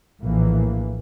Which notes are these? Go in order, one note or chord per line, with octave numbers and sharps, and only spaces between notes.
A#1 A2 E3 A#3